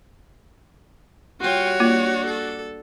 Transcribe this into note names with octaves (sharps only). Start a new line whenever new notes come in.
G3 F4 F#4 C#5 G5
A#3 D4 F4
A4